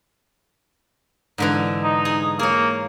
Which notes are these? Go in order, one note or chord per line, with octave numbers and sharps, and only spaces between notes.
G#2 D3 E3
D#4
G#4
A#3 G#4 C#5